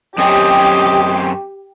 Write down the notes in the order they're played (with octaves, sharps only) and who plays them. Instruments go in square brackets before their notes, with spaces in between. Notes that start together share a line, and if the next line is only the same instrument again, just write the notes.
[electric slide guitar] F#2 C4 C#4 [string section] G4 [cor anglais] D#5